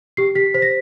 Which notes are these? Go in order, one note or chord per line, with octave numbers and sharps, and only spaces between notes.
G4 C7
G4 B6
C5 B6
A#6